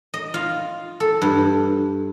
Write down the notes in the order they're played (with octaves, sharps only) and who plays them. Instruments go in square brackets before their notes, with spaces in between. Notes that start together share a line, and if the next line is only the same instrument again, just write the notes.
[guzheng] D#5
F4
A4
G2